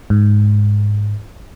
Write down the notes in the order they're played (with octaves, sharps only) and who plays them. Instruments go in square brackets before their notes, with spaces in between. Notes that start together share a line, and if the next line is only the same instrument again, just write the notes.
[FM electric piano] G#2